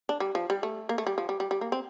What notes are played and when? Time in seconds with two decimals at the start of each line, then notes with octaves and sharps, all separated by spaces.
0.09 D4
0.20 G3
0.35 F3
0.50 G3
0.63 A3
0.89 A#3
0.98 A3
1.07 G3
1.18 F3
1.29 G3
1.40 G3
1.51 G3
1.61 A#3
1.72 C4